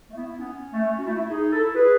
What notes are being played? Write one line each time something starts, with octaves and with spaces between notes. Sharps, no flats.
A3
B3 E4
B3 C#4
A3
F#4
A3 E4
E4
D#4 G#4
E4 A4
G#4 B4